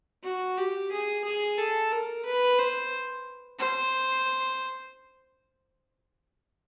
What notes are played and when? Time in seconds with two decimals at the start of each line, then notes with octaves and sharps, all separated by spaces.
0.23 F#4
0.57 G4
0.91 G#4
1.24 G#4
1.57 A4
1.91 A#4
2.25 B4
2.59 C5
3.59 C5